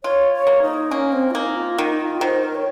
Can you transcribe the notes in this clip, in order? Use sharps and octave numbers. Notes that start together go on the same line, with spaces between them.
F4 C#5
C#5
A#3
D#4
A#3 C#4
C4
F4
A#3 D#4
F4
D#3 D#4
F4
D#3 C5
A#4
C#5